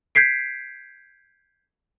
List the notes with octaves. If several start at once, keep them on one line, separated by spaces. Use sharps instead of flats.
G6 G#6 B6 C7 D7